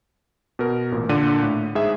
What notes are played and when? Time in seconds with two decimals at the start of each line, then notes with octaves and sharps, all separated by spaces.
0.59 B2 A#4
0.92 A1 A#2
1.09 A#2 D3 D4 D5 D#7
1.43 A2
1.75 G#2 G#4 E5